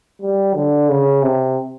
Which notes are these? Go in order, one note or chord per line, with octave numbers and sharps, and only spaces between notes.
G3
D3
C#3
C3